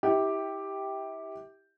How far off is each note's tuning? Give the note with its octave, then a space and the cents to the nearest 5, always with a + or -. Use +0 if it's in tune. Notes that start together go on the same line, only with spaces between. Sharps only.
E4 -30 G4 +0